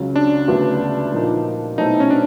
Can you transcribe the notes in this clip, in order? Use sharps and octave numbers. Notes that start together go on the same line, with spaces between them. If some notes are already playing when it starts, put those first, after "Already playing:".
Already playing: C#2 C#3 F#3
D4
D2 C#3 F#3 B3 E4
A#2 F3 A#3 D#4
B2 F#3 A3 C4 D#4 E4
C#4
D4